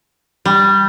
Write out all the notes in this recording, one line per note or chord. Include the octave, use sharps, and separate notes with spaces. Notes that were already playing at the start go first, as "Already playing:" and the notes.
G3